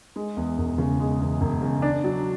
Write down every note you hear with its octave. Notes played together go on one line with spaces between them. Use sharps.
G#3
E2
E1
C#3
G#3
E2
E1
C#3
D4
F#3